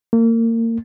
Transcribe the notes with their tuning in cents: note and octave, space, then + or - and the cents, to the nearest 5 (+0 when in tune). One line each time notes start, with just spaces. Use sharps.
A#3 -30